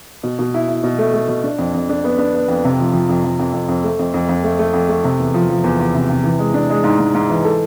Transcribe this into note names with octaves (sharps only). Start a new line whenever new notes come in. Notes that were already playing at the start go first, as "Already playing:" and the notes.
B2
B2
E4
E4
B2
A3
A3
B2
D4
F2
F2
D4
B3
D4
B3
F2
C3
F3
F3
F2
F2
F2
F2
F2
A3
F2
F2
F2
A3
A3
F2
A3
C3
E2
F3
F3
E2
E2
C3
C3
E3
G#3
D4
G#3
G#2
G#2
G#2
E3
A4